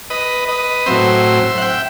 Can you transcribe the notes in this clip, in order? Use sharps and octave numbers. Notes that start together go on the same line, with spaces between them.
B4 D#5
B4 D#5
A2 F#3 C4 C5 E5
F#5
E5 G5